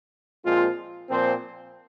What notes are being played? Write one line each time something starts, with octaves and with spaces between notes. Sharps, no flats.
A#2 F3 G#3 C4 F4
A#2 F3 C4